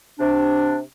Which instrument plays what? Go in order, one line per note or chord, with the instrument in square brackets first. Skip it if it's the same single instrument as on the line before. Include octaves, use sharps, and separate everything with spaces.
[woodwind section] C3 D4